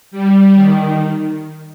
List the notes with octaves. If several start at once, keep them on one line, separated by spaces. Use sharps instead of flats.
G3
D#3